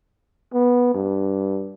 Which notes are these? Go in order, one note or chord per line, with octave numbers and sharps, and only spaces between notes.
B3
G2